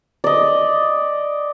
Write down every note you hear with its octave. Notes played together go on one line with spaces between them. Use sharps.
D5 D#5